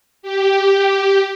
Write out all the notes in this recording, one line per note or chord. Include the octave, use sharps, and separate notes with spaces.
G4